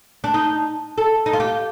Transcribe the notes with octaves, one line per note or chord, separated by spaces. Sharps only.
D4
D#4
A4
D#4
F4
G4